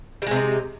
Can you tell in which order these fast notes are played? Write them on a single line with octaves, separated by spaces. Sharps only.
G3 G#3 C3 D#4